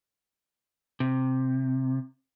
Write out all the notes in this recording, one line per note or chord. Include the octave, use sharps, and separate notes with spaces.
C3